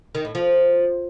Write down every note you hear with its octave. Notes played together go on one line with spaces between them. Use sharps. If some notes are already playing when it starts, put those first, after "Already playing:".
D#3
A2
F3